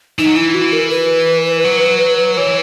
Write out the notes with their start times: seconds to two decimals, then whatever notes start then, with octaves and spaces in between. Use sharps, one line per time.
0.19 E3 D#4
0.27 F#3
0.36 E3 E4
0.54 F#4
0.73 A#4
0.91 B4
1.64 F#3
2.37 E3 C#5